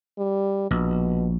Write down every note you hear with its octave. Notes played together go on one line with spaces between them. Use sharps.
G3
A#1 B2